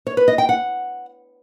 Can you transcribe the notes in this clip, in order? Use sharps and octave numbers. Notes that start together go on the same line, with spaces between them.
C#5
B4
D#5
G5
F#5